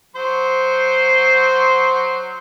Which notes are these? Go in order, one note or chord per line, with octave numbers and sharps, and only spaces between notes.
F#3 C5 C6